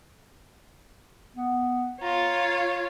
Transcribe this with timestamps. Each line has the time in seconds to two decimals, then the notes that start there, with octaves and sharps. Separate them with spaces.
1.36 B3
2.02 F4 C#5 A#5